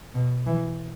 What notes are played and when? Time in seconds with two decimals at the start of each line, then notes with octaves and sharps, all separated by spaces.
0.14 B2
0.46 E3